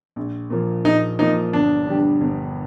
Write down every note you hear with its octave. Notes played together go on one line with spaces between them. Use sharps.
A#1
A#2 F3 A#3
A#1 D#4
A#2 F3 A#3 D#4
G1 D4
G2 D3 G3
G1